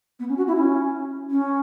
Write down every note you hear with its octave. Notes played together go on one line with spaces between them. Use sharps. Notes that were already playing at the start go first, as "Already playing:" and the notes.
B3
C#4
F#4
E4
C#4
C#4